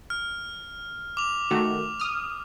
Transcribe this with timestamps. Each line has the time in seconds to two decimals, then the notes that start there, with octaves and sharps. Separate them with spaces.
0.10 F6
1.17 D6 F7
1.51 D#3 A3 F#4
2.00 D#6 F6